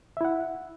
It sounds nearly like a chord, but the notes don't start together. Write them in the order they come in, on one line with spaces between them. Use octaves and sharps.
E5 E4 F#5